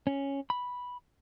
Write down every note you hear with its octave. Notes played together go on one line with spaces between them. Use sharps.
C#4
B5